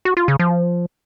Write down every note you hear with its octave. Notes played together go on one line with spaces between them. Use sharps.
F#4
F4
C#3
F3